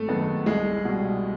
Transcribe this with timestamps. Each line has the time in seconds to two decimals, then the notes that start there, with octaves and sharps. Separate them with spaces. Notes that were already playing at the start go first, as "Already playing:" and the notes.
Already playing: G#1 A3 A4
0.08 F#2 D#3 G#3 B3
0.46 C2 G#3 G#4
0.85 B2 G3